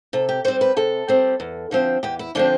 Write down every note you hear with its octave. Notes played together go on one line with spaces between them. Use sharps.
C3 A4
G4
G3 C4 C5
B4
C3 A4
G3 C4
E2
D3 F3 C4
E2 G4
E4
D3 F3 C4 D4